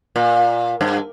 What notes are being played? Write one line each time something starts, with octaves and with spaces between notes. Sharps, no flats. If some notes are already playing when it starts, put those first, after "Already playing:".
A#2
G2